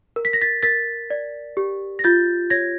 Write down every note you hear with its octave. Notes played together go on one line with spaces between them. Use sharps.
A#4
B6
A#6
A6 B6
A#4 A6 B6
D5
G4
A#6
F4 G6 A6
C#5 G#6 A#6